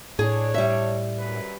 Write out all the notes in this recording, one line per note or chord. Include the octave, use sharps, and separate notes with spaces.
A2 D4 G#4 C#5
G3 E5
F#2 B4